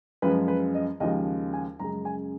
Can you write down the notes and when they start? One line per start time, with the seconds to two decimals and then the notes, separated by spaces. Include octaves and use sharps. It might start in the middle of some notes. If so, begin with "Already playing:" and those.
0.22 F#2 F3 G#3 B4
0.48 B4
0.74 D#5
1.00 D#2 C#3 F3 G#3 D#5
1.53 G#5
1.79 F#2 C#3 G#3 A#5
2.05 G#5